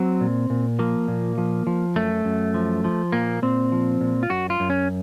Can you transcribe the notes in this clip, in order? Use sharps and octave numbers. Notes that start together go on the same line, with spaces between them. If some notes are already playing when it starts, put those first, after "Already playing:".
Already playing: F#3 C4
A#2
A#2
F3 A#3
A#2
F3
F3
F#2 A3
F#2
F3
F3
A#2 A#3
A#2 C4
F3
A#2
F4
F#2 F#4
F4
F#2
C#4